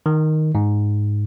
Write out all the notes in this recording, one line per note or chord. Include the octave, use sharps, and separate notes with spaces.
D#3
G#2